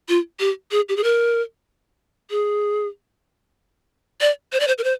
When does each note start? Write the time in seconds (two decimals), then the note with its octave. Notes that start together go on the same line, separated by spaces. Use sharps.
0.09 F4
0.40 G4
0.71 G#4
0.89 G4
0.97 G#4
1.04 A#4
2.30 G#4
4.21 D5
4.53 C5
4.60 D5
4.68 C5
4.78 A#4
4.84 C5